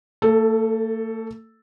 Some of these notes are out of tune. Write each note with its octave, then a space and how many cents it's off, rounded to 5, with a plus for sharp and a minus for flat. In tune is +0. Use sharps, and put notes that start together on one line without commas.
A3 +45 A4 +0